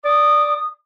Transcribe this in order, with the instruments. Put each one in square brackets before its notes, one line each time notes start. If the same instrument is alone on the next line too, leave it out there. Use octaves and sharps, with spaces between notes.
[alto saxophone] D5 [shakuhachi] D#6